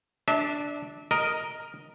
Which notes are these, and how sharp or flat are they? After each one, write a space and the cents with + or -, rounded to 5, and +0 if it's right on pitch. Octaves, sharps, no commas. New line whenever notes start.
D4 +0 E5 -35
A#4 +0 D#5 +0